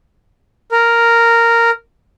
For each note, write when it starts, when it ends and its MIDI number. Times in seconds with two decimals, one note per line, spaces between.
0.72 1.70 70